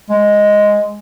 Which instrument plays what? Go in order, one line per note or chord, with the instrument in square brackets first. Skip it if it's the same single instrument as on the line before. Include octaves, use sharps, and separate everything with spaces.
[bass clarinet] G#3